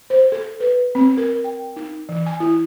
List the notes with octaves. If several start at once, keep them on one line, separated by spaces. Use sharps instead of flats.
C5
A4
B4
C4
A#4
G5
D#4
E3
G#5
E4